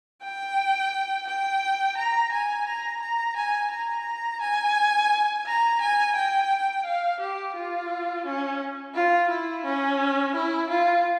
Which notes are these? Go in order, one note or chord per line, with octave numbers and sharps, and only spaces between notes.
G5
G5
A#5
G#5
A#5
A#5
G#5
A#5
G#5
A#5
G#5
G5
F5
G4
F4
C#4
F4
E4
C#4
E4
F4